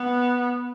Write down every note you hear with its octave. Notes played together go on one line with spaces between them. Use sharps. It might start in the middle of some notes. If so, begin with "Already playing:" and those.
Already playing: B3